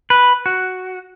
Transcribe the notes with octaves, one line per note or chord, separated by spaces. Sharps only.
B4
F#4